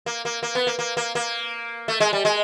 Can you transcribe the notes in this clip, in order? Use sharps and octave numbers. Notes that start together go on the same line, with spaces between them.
A#3
A#3
A#3
B3
A#3
A#3
A#3
A#3
A3
G#3
G3
G#3